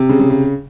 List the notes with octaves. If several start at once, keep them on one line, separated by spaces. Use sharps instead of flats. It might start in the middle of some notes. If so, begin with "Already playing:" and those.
Already playing: C3
C#3
C#3
C#3